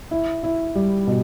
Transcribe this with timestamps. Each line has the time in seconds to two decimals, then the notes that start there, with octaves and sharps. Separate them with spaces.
0.11 E4
0.43 E4
0.75 G3
1.07 B2